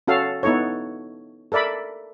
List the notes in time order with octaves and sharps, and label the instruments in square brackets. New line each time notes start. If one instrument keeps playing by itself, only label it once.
[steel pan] C#4 F#4 A4 F5
B3 D#4 E4 A4 C#5
A4 A#4 D5 E5 B5